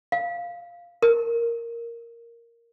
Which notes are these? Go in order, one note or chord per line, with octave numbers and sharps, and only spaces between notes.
F5
A#4